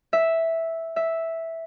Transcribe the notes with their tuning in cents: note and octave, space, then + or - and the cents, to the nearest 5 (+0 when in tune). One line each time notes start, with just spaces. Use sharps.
E5 -5
E5 -5